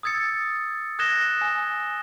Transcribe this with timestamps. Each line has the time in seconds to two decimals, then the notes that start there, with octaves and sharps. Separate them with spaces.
0.03 D#6 E6 G#6 A6 C#7
0.99 D#6 F#6 G#6 A#6 E7 G7
1.41 G#5